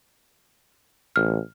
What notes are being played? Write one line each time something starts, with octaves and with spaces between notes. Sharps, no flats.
A1 F6